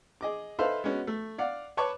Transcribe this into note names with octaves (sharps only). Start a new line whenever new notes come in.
G#4 D#5 D6
D#4 A4 B4 C5 E5 F5
G#3 B3 C#4 F#4
A3
D5 F5 F#5
B4 C#5 A5 C#6 D6